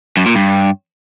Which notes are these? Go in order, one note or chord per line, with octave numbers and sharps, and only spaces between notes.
F#2
A#2
G2